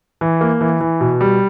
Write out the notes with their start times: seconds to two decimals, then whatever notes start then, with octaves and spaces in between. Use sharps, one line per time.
0.21 E3
0.41 A#3
0.61 E3
0.81 E3
1.01 B2
1.21 G3